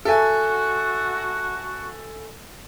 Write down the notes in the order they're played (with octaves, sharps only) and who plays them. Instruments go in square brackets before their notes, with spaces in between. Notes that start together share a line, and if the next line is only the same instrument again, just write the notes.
[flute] F#4 [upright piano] A4 E5 G#5